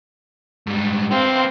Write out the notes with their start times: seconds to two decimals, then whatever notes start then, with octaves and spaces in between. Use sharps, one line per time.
0.67 G#2 G3
1.11 B3 C4 F5